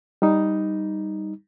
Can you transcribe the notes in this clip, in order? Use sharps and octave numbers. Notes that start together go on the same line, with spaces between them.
G3 D#4